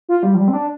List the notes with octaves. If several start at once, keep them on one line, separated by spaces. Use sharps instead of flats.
F4
G3
F3
G3
C4
D4